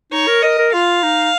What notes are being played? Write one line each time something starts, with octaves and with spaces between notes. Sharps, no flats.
D#4 C#5
A#4
A#4 D#5
A#4
F4 F5
D#4